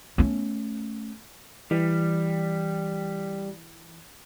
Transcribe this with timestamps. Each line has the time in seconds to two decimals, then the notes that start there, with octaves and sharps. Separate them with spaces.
0.18 A3 C#4
1.71 E3 G3